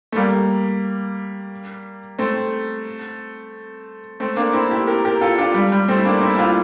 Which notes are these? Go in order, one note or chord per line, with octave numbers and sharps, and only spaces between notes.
A3
G3 A#3
A3 C4
A3 C4
A#3 D4
C4 E4
E4 G4
G4 A#4
G4 A#4
F4 A4
D4 F4
G3
G3
A3 C4
E4
A#3 D4
C4 E4
E4
D4 F4